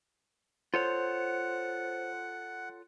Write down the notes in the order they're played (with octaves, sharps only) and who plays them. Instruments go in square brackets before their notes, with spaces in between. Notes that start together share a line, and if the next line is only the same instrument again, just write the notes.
[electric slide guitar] F4 A4 C#5 [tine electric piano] C5 [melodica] F#5